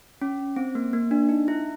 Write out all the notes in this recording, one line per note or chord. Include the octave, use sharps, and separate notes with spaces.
C#4
C4
A#3
A#3
D4
D#4
E4